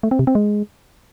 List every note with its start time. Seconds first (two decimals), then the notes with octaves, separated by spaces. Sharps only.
0.03 A3
0.11 C4
0.19 C3
0.27 C4
0.35 G#3